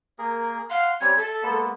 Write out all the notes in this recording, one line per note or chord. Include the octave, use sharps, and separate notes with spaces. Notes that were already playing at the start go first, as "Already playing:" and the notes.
A#3 G#4 A#4
F5 F#5 C6
G3 C4 C#4 G#6
A4 E5
G#3 A#3 B3